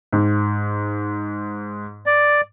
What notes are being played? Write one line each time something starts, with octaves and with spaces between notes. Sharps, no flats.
G#2
D5